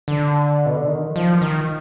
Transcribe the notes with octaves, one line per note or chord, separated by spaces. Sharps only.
D3
B2
D3
D#3
F3
D#3